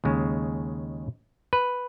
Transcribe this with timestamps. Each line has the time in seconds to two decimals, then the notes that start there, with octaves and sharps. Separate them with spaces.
0.04 D#2 C#3 G#3
1.53 B4